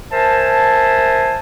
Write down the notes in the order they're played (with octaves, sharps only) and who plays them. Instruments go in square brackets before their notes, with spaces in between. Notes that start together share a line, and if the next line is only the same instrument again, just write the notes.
[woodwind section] A#4 C5 E5 G#5 A5